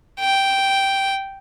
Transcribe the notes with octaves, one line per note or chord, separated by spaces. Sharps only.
G5